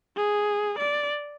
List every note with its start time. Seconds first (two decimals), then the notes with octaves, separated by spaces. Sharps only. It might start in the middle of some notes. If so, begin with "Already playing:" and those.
0.17 G#4
0.79 D5